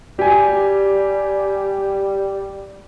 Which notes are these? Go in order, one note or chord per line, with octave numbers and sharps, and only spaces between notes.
G3 G4 G#5